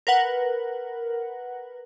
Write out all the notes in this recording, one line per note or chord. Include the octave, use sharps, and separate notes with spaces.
A#4 B4 F#5